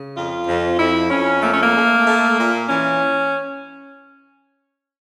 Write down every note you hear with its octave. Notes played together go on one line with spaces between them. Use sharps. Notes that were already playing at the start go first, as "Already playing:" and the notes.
Already playing: C#3
F2 F4
F2
F2 E4
F2 C#4
A3 A#3
C#4
A#3
A3
A3
A#2
E3 C#4